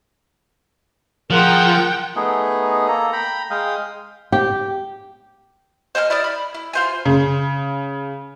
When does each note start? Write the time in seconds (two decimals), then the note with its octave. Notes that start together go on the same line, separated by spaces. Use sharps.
1.30 F3 F4 G#4 A#4 F#5 G5
2.16 A3 B3 D#4 G#4
2.88 A#3 A4 A#5
3.13 G5 A#5 B5
3.51 G#3 F5 G5 D#6
4.32 G4
5.95 C5 D#5 G#5 F6
6.10 E4 D5 D#6 F6
6.24 B5
6.55 E4
6.73 F4 C5 G#5
7.05 C#3